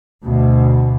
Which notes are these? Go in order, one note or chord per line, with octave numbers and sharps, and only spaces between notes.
D2 B2